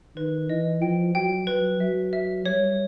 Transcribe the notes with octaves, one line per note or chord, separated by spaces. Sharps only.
D#3 B4
E3 D#5
F3 G5
F#3 G5
F#3 B4
F#3 E5
E5
G3 C#5